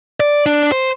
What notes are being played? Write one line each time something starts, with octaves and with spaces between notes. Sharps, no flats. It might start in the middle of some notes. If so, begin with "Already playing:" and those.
D5
D4
C5